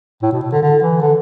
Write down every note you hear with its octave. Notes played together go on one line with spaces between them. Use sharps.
A2
B2
A2
D3
D3
E3
D3